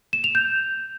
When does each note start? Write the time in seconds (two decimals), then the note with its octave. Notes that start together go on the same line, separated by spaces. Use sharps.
0.13 E7
0.24 F7
0.35 G6